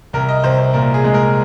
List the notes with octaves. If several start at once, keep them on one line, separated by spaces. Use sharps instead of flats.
C2 A#4
D#5
C2 C5
C5
A#2 A#4
G#4
G#3
A#4